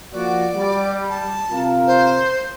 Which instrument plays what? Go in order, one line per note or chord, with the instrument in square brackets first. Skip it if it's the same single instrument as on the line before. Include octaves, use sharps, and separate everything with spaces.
[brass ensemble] F3 A#3 F#4 [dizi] D5
[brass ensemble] G3
[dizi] A5
[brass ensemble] C3 F4 A#4
[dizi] C5